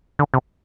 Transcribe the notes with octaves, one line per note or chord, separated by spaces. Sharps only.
D3
C3